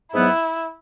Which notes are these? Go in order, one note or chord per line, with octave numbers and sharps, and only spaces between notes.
G#2 F#3 B3 E4